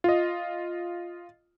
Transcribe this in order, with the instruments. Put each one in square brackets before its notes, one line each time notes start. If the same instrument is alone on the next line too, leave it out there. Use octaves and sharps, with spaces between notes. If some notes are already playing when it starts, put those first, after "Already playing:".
[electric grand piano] F4 D#5